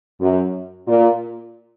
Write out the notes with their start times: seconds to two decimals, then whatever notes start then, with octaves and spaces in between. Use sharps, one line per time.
0.21 F#2
0.87 A#2